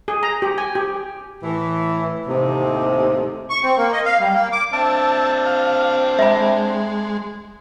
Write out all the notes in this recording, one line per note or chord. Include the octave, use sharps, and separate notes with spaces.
G#4
A#5
G4
G#5
G4
A2 E3
D#2 A2 C3
C#6
C4
A#3
D#5
F5
G3
A#3
D6
C4 D4 E5 A5
F5
G#3 E5 B5